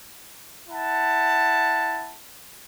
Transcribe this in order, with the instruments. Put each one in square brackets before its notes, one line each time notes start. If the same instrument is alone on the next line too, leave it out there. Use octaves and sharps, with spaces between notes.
[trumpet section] E4 F#5 A5